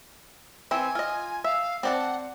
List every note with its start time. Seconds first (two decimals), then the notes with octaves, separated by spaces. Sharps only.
0.71 E3 C4 G#5
0.95 F4 D#5
1.44 E5 F5
1.83 C4 D5 F#5 A5